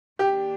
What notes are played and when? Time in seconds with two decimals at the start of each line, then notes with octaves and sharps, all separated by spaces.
0.19 D#3 A#3 D4 G4